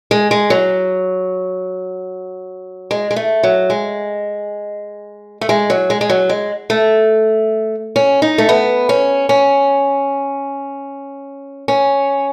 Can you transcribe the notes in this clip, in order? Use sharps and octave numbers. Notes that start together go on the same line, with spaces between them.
G#3
G#3
F#3
G#3
G#3
A3
F#3
G#3
A3
G#3
F#3
G#3
G#3
F#3
G#3
A3
C#4
D#4
A3
B3
C#4
C#4
C#4